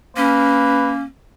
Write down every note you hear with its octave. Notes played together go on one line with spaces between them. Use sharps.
A#3 C#4 B4